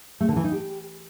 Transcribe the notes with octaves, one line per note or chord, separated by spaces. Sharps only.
A3
D3
E3
D#4
G4